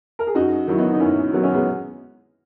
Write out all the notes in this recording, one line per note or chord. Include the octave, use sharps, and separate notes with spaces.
A#4
G#4
F#2 D#4 F#4
D#3 F#3 E4
B3 D#4
D#4
F#2 C#4 E4
D#3 F#3 B3
C#4
G#3 B3